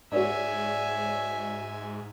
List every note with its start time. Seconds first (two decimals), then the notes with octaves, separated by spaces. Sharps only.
0.12 G#2 F#4 C#5 D5 E5 G#5